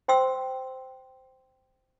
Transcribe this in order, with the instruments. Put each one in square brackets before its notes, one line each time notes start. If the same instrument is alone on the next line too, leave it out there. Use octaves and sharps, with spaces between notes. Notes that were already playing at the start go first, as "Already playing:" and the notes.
[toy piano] C5 G5 C6 E6